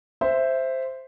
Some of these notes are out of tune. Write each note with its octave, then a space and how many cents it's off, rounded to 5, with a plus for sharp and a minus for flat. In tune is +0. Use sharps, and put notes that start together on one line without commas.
C5 +0 E5 +5